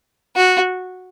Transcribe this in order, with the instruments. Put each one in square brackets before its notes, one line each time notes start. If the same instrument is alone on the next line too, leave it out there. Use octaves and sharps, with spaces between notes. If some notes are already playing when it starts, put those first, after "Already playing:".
[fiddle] F#4